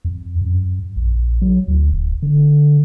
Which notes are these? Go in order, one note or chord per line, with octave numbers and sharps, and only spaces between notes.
F2
F#2
A#1
F#3
D2
D1
D3